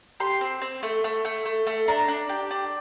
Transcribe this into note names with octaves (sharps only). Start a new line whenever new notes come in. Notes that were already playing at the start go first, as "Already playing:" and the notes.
G4 C6
C4
C4
A3
A3
A3
A3
A3
D4 A#5
D4
G4
D4